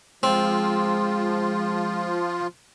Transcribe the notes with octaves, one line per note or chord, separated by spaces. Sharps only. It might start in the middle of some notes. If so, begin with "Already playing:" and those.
F3 G#3 C4 F4